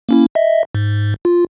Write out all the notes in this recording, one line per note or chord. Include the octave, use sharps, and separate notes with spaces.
A#3 C#4 E4
D#5 E5
G#2
F4